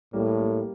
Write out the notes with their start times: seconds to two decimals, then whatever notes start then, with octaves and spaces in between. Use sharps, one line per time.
0.13 A2 G3 A#3
0.38 G3 A#3